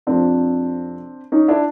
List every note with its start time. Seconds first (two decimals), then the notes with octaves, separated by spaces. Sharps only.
0.07 F2 C3 F3 C4 D4
1.32 C#4 D#4
1.48 D4 E4